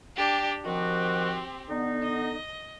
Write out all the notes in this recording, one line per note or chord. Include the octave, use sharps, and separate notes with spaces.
D4 G4 G5
D#3 F3 C4 F#4 G4
D3 B3 D#4
D#5